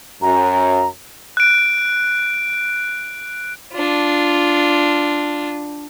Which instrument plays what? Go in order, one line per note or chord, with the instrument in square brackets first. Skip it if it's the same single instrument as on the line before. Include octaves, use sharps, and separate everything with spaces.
[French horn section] F#2 [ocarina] A#5
[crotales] F#6 D7
[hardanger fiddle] D4 F4